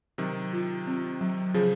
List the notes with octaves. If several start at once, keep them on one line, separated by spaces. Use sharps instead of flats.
C3 D#3 F#3
F4
C4
F#3
C#3 F3 G#4